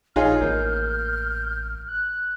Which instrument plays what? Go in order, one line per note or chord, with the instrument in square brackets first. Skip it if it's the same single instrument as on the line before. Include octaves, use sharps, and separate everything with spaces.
[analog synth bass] A#1 [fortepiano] D#4 F4 G#4 [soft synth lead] C#5 [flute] F6
[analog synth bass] A1 [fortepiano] A#3 [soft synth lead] G6
[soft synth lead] F#6